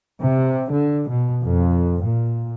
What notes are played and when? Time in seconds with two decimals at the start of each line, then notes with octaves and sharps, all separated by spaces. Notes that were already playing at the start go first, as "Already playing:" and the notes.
0.21 C3
0.70 D3
1.09 B2
1.43 F2
2.04 A#2